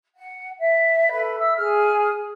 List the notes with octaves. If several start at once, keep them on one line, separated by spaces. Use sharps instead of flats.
F#5
E5
A4 B4 B5
E5 E6
G#4 F6